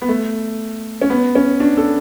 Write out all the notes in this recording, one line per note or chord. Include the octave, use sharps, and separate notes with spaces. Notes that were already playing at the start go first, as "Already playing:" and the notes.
B3
A3
C#4
B3
C#4
D4
A4